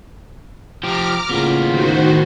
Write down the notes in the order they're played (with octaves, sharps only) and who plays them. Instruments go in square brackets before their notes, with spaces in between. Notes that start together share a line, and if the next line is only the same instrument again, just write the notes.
[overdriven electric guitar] F3 G4 [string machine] A#5 D6 F6
[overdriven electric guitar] A2 B3 [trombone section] C#3 A#3 F4
[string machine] D#3 F#4 C5